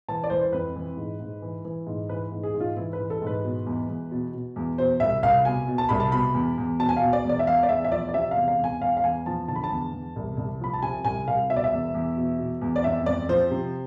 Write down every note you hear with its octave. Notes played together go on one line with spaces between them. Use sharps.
E3 A5
D5
E3 C5
C5
F2 B4
E3
G#2
G#2
E3
E3
G#2
E3 B4
G#2
G#4
G#2
F4
E3 E4
B4
E3
A4
G#2 B4
B2
E2
E2
B2
B2
E2
B2 C5
C2 E5
C2 F5
B2 G#5
B2
A5
C2 B5
A5
B2 B5
E2
E2
B2 A5
G#5
B2 F5
D5
E2 D5
E5
E2 F5
D5
E2 E5
E5
F3 D5
D5
C3 E5
E2 F5
F5
E2
G#5
E2 F5
F5
E2 G#5
F3 A5
D3 A5
B5
A5
E2
E2
C2
C2
F3 B5
A5
C3 G#5
C2 G#5
C2 F5
B2 E5
D5
E5
E2
E2
B2
B2
E2
D5
F2 E5
F2 D5
F3 C5
C3